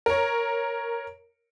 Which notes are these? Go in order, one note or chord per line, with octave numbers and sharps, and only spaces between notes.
A#4 C#5